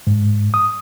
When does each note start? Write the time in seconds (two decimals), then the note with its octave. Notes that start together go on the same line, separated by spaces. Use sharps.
0.07 G#2
0.54 D#6